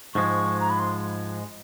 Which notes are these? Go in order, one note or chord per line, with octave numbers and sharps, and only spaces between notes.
G#2 F3 G#3 C#6
A#5
B5
C6